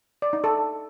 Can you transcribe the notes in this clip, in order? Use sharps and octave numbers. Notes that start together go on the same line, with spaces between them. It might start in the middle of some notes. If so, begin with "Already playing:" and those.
D5
D#4
A4